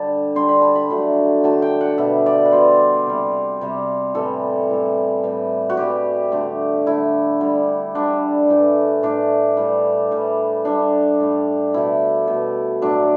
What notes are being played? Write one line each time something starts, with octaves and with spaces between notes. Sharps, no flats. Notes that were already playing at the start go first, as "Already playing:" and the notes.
Already playing: D3 G3 A5
D3 G3 C6
B5
A5
B5
D3 F#3 A3
D3 F#3 A3 A5
G5
F#5
B2 G3 E5
D5
B4
B2 G3 C5
C3 G3
C3 G3
A2 E3 G3 A4
A2 E3 G3
A2 E3 G3
F#4
A2 E3 G3 G4
D3 A3
D3 A3 E4
D3 G3
D3 G3 D4
A2 E3 A3
A2 E3 A3 D4
A2 E3 G3
A2 E3 G3
A2 G3 D4
A2 G3
B2 A3 E4
B2 A3
A2 F#3 A3 D4